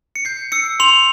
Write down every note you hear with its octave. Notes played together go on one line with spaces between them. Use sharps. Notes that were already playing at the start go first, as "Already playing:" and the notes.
C#7
G6 C7
E6 C#7
C6 F7